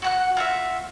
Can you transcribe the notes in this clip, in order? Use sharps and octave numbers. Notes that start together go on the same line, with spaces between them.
F#4 F#5 F#6
F4 F#4 E5